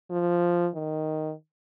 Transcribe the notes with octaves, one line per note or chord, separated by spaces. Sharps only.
F3
D#3